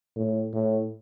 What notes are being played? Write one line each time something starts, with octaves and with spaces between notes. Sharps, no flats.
A2
A2